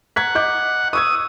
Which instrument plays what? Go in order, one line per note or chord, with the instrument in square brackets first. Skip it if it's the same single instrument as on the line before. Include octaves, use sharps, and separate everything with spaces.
[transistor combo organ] F#5 [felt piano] A#5 G#6 B6
[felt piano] D#5 D6 G6
[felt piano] C#6 E6 G#6 [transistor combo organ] D#6